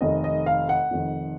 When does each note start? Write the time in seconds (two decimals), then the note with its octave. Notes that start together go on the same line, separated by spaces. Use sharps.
0.01 F1 F2 D#3 D#5
0.24 D#5
0.46 F5
0.69 F#5
0.91 F1 F2 D#3